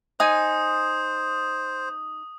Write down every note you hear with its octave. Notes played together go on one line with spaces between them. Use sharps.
D#4 C5 G#5 D#6